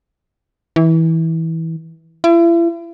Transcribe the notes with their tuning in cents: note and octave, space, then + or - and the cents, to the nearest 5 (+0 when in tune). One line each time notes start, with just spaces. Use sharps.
E3 -20
E4 +40